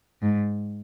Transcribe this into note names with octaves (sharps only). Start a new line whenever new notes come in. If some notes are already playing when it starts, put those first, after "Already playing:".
G#2